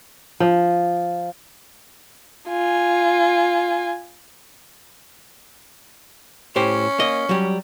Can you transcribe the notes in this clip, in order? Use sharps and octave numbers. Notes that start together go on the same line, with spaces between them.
F3
F4 G#5
A2 C#4 G4 C5
A#3 D#5
F#3 G3